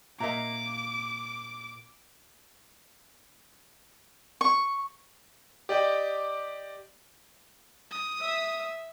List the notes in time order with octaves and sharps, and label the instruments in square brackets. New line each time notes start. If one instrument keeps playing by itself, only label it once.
[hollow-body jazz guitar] A#2 A#3 [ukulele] D#5 E5 A#5 [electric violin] D6
[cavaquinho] C#6
[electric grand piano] G4 D5 D#5 G5
[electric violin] D#6
[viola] E5